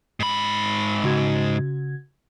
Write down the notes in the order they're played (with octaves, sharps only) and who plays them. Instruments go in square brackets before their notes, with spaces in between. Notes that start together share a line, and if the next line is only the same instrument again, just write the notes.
[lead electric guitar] G#2 B5
[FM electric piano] C#3 F#4 G#6